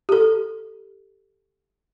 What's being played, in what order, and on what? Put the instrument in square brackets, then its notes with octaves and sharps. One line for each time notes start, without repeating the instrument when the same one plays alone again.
[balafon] G4 A4